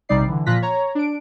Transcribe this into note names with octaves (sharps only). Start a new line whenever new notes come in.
A#1 C3 G3 D#4 D5 C7
D3 E3
A#2 F3 F4 F#6 A#6 B6
C#5 A#5
D4 D7